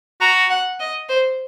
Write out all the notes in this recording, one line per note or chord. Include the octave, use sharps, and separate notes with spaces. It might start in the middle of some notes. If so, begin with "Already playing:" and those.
F#4 A#5
F#5
D#5
C5